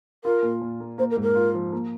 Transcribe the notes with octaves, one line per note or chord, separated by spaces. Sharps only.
F4 A#4
A#2
A#2
A#3
A#3 C5
A#4
G#2
A#4
F4
F3
A#3